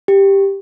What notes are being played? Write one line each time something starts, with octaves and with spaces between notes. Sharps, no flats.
G4